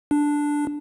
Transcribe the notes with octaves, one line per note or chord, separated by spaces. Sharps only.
D4